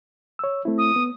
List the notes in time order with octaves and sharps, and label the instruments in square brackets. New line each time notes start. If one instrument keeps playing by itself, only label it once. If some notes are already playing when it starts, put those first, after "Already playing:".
[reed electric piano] C#5 E6
A3 C4 E4
[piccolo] D#6
[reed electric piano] B3